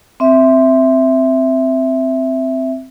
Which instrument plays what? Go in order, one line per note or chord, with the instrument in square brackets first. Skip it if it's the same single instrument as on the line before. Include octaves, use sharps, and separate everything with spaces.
[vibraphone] C4 E5